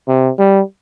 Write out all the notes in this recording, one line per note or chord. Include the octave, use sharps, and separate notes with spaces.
C3
G3